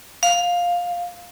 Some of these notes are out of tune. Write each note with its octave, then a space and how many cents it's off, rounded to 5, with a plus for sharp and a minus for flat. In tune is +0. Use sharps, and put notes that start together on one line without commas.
F5 +10